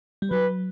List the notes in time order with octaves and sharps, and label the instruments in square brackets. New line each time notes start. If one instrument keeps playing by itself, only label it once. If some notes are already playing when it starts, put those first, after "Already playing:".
[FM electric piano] G3
[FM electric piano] F#3 [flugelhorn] B4